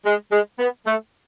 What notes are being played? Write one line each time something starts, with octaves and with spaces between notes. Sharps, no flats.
G#3
G#3
B3
A3